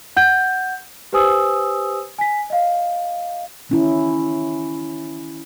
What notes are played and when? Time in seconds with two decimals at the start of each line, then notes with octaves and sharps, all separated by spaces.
0.16 F#5 G6
1.13 G4 B4 C5 G#5 D#6 E6
2.18 G#5 B6
2.50 D#5 F5
3.69 D#3 C#4 E4